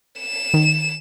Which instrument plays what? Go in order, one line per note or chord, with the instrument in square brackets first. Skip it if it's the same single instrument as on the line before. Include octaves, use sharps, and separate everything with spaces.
[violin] E7
[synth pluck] D#3